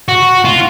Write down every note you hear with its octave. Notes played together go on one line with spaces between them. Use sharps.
F#4
F4